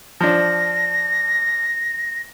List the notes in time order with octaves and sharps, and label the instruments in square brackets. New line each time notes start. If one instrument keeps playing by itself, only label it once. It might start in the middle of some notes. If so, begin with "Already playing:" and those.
[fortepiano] F3 D4 [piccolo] A#6